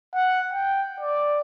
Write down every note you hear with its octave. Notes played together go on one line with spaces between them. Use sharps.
F#5
G5
D5